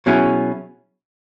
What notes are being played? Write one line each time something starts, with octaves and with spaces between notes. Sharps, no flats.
B2 F#3 C#4 E4 G#4